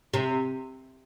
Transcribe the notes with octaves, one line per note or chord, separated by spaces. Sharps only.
C3